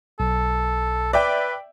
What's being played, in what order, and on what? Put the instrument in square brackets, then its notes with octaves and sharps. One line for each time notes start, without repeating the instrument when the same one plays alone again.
[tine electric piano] B1 [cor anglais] A4
[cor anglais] B4 [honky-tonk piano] D5 E5 G5